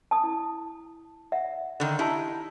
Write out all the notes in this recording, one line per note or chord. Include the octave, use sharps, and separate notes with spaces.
A5 D#6
E4
E5 F#5
D3 D#3
D#4 E4 G4 A5